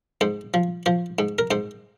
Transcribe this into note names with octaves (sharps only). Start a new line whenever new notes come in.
G#2 C5
F3
F3 C5
G#2
A#4
G#2 C5